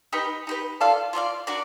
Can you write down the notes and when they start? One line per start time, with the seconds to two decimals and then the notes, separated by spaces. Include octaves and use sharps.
0.13 D#4 G4 B4
0.47 D#4 G4 B4
0.81 F4 A4 D5 F5
1.13 F4 A4 D5 F5
1.47 D4 F#4 A#4 D5